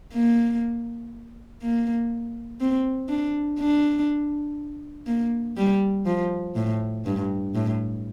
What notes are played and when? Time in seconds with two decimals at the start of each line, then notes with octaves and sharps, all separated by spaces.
0.14 A#3
1.62 A#3
2.61 C4
3.09 D4
3.59 D4
5.07 A#3
5.57 G3
6.06 F3
6.56 A2
7.05 G2
7.55 A2